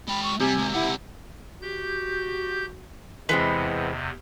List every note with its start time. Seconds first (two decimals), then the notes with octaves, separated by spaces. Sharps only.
0.08 G#3 G5 B5
0.23 C#6
0.40 C3 G3 G#5
0.58 G#3 C4
0.74 C#2 E4 F#5
1.62 F#4 G4 G6
3.29 E2 C3 E3 G#3 B3 C4 D#5